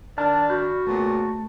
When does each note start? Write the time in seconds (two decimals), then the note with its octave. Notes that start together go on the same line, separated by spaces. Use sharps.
0.18 D#3 D4 D5 A5 F6
0.50 F#4 B5 F6 G6
0.87 A#2 C#3 A3 B3